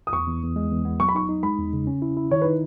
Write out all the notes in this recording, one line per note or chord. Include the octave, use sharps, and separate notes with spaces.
D#6
E2 C#6
E2
E2
G#3
E2
B3
F#3 C#6
B5
D#4 C#6
D#4
G#3 B5
E2
C#3
C#4
E4
E4
D#3 C#5
D#4 B4